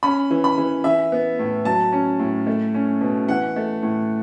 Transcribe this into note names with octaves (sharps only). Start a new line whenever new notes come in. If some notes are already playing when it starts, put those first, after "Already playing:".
C#4 B5
E3
B5
E3
E3 E5
B3
A2
F#3 A5
C#4
A2
A3
C#4
B2
E3 F#5
A3
A2